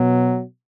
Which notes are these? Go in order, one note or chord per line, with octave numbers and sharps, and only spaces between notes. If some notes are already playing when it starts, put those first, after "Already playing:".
Already playing: B2 F#3